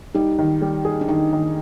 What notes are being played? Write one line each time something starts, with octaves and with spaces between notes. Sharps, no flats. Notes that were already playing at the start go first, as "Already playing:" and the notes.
G3 D#4
D#3
G3
G#4
D4
D#3 D#4
D#3